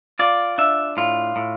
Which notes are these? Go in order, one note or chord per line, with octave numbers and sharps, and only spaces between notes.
F4 D5
D4 E5
A2 F4
A2